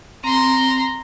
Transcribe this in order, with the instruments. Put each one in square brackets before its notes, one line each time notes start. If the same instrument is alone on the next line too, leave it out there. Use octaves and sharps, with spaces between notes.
[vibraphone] C4 [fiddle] A#5 C6